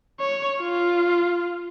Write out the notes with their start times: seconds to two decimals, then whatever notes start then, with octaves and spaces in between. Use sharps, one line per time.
0.20 C#5
0.60 F4